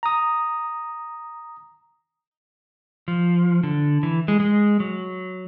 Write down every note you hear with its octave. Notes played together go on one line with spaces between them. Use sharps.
A#5 D#6
F3
D3
E3
G#3
G#3
F#3